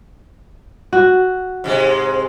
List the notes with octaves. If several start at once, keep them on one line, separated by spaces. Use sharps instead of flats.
F#4
G#2 C3 G#3